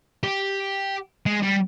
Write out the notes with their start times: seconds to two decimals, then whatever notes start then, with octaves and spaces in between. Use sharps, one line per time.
0.24 G4
1.26 G#3
1.43 G3